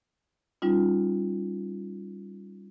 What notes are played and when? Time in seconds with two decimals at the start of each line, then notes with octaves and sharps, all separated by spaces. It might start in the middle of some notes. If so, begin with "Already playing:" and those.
0.62 G3 C#4 D#4 F4